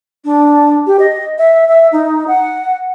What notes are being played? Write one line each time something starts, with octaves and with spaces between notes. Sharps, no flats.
D4
G4
D#5
E5
E5
D#4
F#5